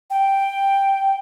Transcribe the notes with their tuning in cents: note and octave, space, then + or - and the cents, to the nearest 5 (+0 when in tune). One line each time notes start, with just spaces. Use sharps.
G5 +0